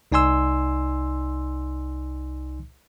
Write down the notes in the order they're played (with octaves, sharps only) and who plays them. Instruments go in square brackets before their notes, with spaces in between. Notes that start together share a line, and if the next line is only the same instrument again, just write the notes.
[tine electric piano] C2 D#4 D5 G#5 C6 E6